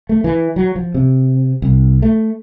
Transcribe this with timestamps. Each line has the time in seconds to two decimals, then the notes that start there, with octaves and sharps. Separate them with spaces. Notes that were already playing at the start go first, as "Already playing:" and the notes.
0.09 A3
0.24 E3
0.56 F#3
0.76 F3
0.94 C3
1.62 C2
2.02 A3